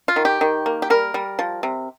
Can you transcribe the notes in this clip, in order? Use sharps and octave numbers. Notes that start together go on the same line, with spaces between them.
F4
D#3
G4
D#3
A#3
G4
G3 A#4
G3
F3
C3